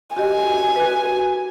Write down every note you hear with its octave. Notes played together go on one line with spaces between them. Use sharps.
F#4 G4 D#5 G#5
F#4 B4